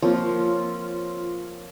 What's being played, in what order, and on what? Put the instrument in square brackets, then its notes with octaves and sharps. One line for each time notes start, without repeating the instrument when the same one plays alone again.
[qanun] F3 [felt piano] A#3 C4 C#5 [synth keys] F4